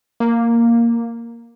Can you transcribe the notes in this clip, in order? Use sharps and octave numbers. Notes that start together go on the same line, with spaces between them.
A#3